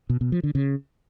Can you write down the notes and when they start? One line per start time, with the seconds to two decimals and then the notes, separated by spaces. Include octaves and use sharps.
0.10 B2
0.21 B2
0.32 F3
0.43 D3
0.55 C#3